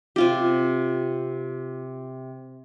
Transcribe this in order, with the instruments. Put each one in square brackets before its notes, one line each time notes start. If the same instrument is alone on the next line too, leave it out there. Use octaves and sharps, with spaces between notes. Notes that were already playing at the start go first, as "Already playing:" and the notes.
[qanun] C3 F4 G4